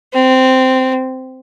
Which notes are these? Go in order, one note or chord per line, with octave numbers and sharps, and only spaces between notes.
C4